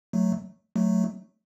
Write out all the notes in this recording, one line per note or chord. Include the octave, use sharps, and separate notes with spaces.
F#3 A3
F#3 A3